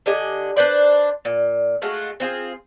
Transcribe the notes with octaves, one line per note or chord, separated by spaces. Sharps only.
D3 G4 D#5 G#5
D4 B4 C5 D5
A#2
G#3 A3 F4 F#4
C4 F4 G#4